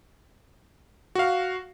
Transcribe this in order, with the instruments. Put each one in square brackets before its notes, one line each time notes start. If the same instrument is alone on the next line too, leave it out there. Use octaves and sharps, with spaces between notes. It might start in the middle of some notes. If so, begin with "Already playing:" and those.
[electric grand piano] F#4 F5